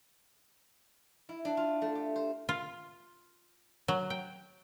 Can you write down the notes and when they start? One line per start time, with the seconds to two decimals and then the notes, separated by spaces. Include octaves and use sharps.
1.29 E4
1.45 D4
1.57 F4
1.82 A3
1.95 G4
2.16 C5
2.49 F4
3.88 F#3
4.10 G5